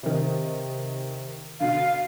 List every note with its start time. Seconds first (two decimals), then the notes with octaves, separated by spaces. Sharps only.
0.03 C3 D#3
1.60 B2 D3 F5